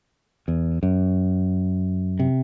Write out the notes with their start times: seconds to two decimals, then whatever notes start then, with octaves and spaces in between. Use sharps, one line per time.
0.48 E2
0.83 F#2
2.19 C3